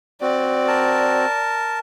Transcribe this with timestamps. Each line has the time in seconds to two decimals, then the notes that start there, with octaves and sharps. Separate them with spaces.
0.22 C4 F#4 D5
0.68 A#4 A5